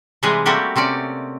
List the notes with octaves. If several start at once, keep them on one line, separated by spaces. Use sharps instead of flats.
C3 E3 G3 G#3 G#4 B4
G3 A3 A#3 C4 F#4 G4
C3 C4 C#4 D5